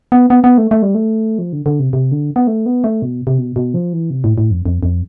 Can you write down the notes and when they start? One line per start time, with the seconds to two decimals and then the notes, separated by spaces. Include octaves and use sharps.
0.12 B3
0.30 B3
0.44 B3
0.58 A3
0.71 A3
0.82 G3
0.95 A3
1.39 F3
1.53 D3
1.66 D3
1.80 C3
1.93 C3
2.12 D3
2.36 B3
2.47 A3
2.66 B3
2.84 A3
3.02 B2
3.27 C3
3.38 B2
3.56 B2
3.74 F3
3.93 E3
4.10 C3
4.24 A2
4.38 A2
4.51 F2
4.66 F2
4.83 F2